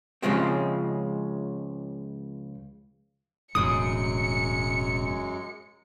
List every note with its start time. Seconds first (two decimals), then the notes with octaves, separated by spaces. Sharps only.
0.22 C#2 C#3 F3 G#3 C4
3.55 E1 F#2 A2 C#3 F#3 G#3 D#6 C#7